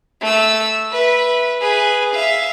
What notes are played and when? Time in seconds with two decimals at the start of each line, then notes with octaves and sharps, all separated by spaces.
0.21 A3 E6
0.91 B4 E5
1.61 G#4 B4
2.14 E5 F5